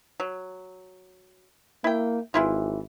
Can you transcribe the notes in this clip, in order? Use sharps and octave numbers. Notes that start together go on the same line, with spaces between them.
F#3
A#3 E4 G5
G#1 E3 E4 F4